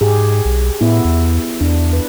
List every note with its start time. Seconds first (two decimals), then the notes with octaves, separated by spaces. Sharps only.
0.01 G#2 G4 G#4
0.45 B1
0.81 A2 B3 E4
1.05 E2
1.61 E2 D4
1.93 B4